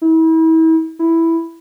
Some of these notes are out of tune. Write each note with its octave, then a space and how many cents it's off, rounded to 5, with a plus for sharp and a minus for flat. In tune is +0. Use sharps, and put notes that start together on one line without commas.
E4 -35
E4 +0